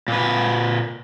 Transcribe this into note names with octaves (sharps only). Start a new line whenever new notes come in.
A#2 B4